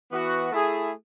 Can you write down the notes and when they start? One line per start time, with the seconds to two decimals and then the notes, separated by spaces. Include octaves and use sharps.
0.12 E3 B3 F#4
0.52 A3 E4 G#4